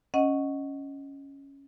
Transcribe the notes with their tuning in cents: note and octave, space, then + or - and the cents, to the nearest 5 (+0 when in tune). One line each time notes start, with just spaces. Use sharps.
C#4 +0 D#5 +0 F#5 +0